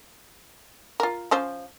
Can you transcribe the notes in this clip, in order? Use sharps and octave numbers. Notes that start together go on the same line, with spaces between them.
F4 A#4
F3 C#4 C5